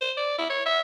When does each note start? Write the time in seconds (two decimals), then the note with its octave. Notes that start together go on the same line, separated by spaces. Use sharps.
0.01 C5
0.17 D5
0.38 E4
0.50 C#5
0.66 E5